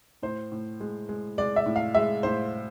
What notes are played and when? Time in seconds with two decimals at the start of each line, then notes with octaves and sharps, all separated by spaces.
0.22 A2 C5
0.52 A2
0.80 G#3
1.09 G#3
1.38 G#3 D5
1.56 E5
1.66 A2
1.76 F5
1.95 G#3 E5
2.23 A2 C5